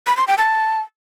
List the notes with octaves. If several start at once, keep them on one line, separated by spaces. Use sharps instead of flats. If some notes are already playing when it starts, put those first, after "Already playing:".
B5
C6
G5
A5